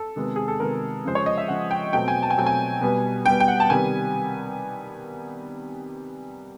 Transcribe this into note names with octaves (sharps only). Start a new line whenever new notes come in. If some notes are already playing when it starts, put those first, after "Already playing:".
Already playing: A4
C3 D#3 G#3 B3
G#4
A4
C3 D#3 G#3 B3 A#4
C#3 F3 G#3 C5
C#5
D#5
E5
C#3 F3 G#3 F#5
G5
B2 F#3 A3 C4 G5
G#5
A5
G#5
B2 F#3 A3 C4 G5
G#5
B2 G3 B3
B2 G3 B3 G5
G5
F#5
A5
C3 D#3 G3 B3 G#5